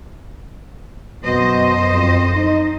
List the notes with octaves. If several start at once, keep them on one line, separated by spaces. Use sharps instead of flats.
F#2 B2 C5 D#5
F2
D#4